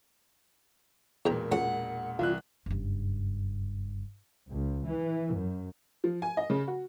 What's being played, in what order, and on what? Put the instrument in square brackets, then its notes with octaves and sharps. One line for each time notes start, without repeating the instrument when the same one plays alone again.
[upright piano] E1 A#2 [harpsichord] E2 G5 A#5
[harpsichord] C#2 [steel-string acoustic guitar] F#5
[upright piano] C2 E3 F#6 [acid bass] F4
[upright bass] F#1 G2
[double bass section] C#2
E3
F#2
[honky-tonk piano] F3
G#5
D#5
C#3
F#4